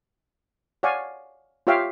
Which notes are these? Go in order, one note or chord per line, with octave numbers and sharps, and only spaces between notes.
C#5 D5 F5 F#5 G#5
F4 G4 C#5 E5 F5 G5